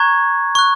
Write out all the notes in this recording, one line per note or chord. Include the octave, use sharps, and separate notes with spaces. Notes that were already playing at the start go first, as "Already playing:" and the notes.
Already playing: A#5 C#6 F#6 G#6
C#6 F#6